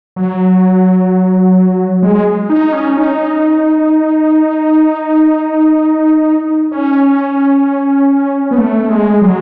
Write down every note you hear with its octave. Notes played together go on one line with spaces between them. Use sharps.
F#3
G#3
D#4
C#4
D#4
C#4
B3
A3
G#3
F#3